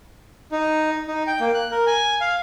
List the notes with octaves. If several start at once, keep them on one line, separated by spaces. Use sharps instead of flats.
D#4
D#4
G5
A#3
F#6
A#4
G#5
F5